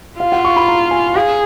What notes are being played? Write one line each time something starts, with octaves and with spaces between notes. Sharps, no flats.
F4 F5
F#5
C#6
B5
A#5
G#5
G#4 F5